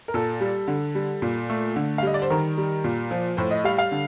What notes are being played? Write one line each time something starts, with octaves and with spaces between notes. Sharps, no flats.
A#4
A#2 A4
G3
D3
G3
A#2
A3
D3
F5
G3 D#5
D5
C5
D#3 A#4
G3
A#2
F3
A2 C5
D#5
G3 F5
F5
D3